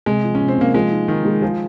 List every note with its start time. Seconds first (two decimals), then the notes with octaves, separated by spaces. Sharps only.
0.06 C3 G#3
0.24 F3
0.35 C#4
0.41 C3
0.48 C4
0.57 C3 A#3
0.74 F3 G#3
0.91 D#4
1.08 D#3 D#4
1.25 G#3
1.42 F3 G#4